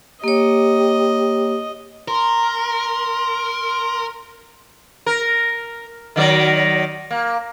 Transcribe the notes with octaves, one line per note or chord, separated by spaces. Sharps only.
A#3 G4 C#5 D#5
A#4 C6
A#4
D#3 F#3 D5
A#3